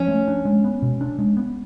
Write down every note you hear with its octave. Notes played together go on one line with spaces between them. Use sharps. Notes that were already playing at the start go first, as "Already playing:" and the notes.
Already playing: F3 C#4
A3
D4
G#3
B3
B2
D4
G#3
B3